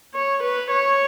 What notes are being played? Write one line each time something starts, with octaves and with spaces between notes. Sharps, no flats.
C#5
B4
C#5